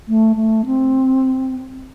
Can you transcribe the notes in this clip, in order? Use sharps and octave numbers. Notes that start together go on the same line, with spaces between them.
A3
A3
C4